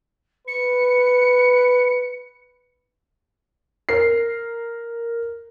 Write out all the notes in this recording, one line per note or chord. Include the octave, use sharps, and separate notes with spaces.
B4 C#7
A#4 C7